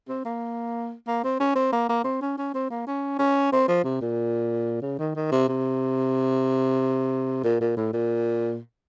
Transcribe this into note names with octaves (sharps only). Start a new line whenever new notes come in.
C4
A#3
A#3
C4
C#4
C4
A#3
A#3
C4
C#4
C#4
C4
A#3
C#4
C#4
C4
F3
C3
A#2
C#3
D#3
D#3
C3
C3
A#2
A#2
A2
A#2